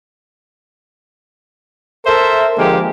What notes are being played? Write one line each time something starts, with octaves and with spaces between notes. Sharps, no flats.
A4 A#4 C5 E5
D3 F3 G#3 A#3 G4